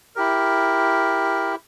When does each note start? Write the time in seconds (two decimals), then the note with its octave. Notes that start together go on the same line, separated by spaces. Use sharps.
0.16 E4 G4 A#4